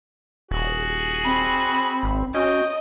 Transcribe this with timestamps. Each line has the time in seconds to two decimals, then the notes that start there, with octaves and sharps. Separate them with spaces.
0.51 D#1 F#4 G#4
1.25 C4 B5
2.03 G#1
2.34 C#4 F#4 D#5 G5